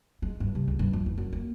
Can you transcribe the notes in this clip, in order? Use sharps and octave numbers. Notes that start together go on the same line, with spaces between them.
G#3
G2
C3
C#2
G2
F2
E2
F#2
A#3